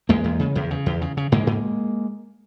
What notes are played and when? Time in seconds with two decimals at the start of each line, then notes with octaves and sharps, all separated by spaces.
0.09 E2 G#3 A#3
0.24 E2
0.39 C#3
0.55 E2
0.71 C#3
0.86 E2
1.02 C#3
1.17 C#3
1.32 G#2 G#3 A#3
1.47 G#2